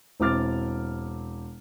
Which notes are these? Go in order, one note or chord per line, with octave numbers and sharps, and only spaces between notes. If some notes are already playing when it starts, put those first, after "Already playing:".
E1 C4 E4 D6 F6 A6